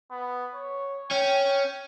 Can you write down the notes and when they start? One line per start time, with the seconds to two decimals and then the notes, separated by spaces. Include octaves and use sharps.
0.11 B3
0.55 C#5
1.11 C#4 G5